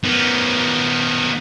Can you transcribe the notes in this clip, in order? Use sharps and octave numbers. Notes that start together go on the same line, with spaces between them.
D#3 B3